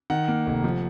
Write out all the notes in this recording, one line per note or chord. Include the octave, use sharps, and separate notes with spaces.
D#3 F#5
A#3
F1
F3